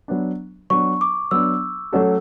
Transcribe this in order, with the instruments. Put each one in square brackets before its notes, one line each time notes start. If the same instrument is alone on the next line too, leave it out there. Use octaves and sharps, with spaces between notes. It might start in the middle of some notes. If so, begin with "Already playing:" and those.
[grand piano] F#3 B3 D4
[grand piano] F#3 B3 D4 [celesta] C#6
[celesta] D6
[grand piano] F#3 B3 D4 [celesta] E6
[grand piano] F#3 A3 C#4 F#4 A4